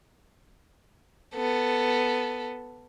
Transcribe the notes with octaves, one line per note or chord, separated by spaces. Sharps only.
B3 A4